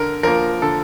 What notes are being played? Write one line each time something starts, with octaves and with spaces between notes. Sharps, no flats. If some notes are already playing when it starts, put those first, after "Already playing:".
Already playing: D3 A#4
F3 A#3 A#4
D3 A4